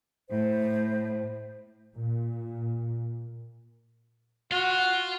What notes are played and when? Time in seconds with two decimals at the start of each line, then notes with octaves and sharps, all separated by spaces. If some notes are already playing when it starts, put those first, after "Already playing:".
0.29 A2 C5
1.95 A#2
4.52 F4 F#4